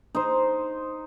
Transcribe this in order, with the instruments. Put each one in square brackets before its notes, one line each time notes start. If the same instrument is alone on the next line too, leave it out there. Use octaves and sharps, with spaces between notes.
[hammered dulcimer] D#4 C5